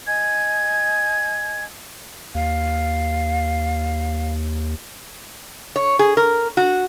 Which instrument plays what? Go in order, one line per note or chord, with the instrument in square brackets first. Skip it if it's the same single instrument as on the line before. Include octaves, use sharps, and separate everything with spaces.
[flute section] D#5 G#5 G#6
[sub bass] D#2 [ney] F5
[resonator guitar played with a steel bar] C#5
G#4
A#4
F#4